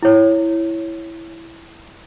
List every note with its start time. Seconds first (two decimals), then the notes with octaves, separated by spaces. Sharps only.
0.02 E4 C#5